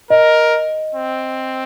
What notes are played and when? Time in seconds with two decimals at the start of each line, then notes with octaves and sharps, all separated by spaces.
0.10 A#4 D#5
0.95 C4